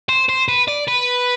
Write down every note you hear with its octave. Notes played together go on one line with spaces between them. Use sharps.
C5
C5
B4
D5
B4